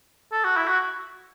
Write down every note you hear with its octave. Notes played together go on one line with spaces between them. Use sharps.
A4
F#4
E4
F#4